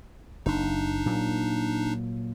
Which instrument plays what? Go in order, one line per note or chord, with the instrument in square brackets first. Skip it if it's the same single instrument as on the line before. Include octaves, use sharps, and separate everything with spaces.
[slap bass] F#1 [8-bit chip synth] D4 D#4
[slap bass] A#2 F#3 A#3